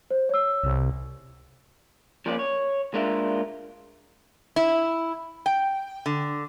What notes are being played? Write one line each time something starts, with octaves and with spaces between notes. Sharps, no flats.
C5
C#5 E6
C2
F3 A#3 C#4 F4 D5
C#5
G#3 A#3 D4 F4 A#4 E5
E4
G5
D3